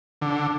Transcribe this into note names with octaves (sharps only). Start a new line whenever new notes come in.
D3